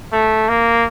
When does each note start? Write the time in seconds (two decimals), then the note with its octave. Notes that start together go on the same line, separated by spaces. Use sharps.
0.12 A3
0.49 A#3